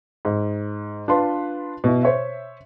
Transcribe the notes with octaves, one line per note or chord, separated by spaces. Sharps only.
G#2
D4 F4 B4 C6
B2 E4
C5 C#5 E5